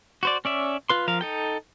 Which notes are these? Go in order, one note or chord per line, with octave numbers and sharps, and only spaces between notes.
F#4 C5 D5
C#4 D5 E5
F4 B4 C6
F3 A#4 F5
D#4 A4 G5